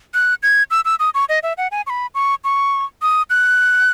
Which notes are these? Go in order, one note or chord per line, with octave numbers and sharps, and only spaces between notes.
F#6
G#6
E6
E6
D#6
C#6
D#5
E5
F#5
G#5
C#6
B5
C#6
C#6
D#6
F#6